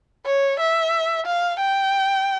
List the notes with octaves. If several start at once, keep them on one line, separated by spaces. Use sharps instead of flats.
C#5
E5
F5
G5